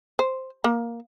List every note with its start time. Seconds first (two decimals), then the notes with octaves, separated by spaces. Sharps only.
0.19 C5
0.64 A#3